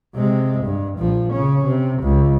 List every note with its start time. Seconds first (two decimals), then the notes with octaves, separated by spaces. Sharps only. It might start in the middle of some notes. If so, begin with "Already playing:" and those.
0.15 C3 G#3
0.64 G2
0.99 A#1 F3
1.32 C#3 C#4
1.65 C3
2.02 C#2